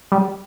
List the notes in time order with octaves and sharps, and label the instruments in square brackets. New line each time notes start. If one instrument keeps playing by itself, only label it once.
[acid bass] G3